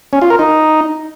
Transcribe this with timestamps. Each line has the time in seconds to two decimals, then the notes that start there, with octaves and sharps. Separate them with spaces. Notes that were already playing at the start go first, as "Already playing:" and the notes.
0.13 C#4
0.22 F4
0.30 A#4
0.39 D#4